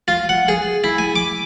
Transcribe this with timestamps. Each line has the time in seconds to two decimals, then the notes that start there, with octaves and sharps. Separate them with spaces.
0.08 F4
0.29 F#5
0.48 G#4
0.84 E4
0.98 G#5
1.16 D6